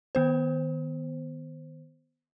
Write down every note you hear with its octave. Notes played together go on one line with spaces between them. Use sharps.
D#3 B3 C5